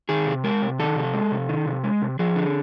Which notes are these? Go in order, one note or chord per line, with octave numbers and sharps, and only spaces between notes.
D#3 G#4
C3
G#3 A#4
C3
D#3 A4
C3
G#3
C3
D#3
C3
G#3
C3
F3 G#4
D3